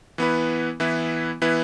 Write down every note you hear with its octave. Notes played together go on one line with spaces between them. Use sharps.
E3 B3 E4 B4
E3 B3 E4 B4
E3 B3 E4 B4